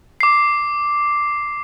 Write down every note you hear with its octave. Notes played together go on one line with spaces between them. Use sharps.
D6 C7